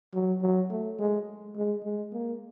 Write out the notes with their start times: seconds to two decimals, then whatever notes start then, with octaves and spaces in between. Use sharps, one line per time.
0.14 F#3
0.42 F#3
0.70 A3
0.99 G#3
1.56 G#3
1.84 G#3
2.13 A#3